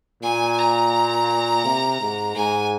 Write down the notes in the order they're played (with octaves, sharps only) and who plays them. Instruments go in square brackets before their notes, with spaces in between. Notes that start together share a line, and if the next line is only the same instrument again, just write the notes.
[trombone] A#2 [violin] G#5
[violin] A#5
[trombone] C3
G#2
[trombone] G#2 [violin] G#5